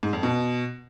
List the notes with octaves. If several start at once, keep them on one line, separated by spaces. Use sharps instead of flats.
G#2
F2
B2